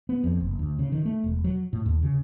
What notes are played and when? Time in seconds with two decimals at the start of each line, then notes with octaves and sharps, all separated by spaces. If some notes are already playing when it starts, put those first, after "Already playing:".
0.09 B3
0.24 F2
0.40 F#1
0.59 D2
0.79 C#3
0.92 D#3
1.06 A3
1.24 E1
1.44 F#3
1.73 A2
1.86 D#2
2.03 C#3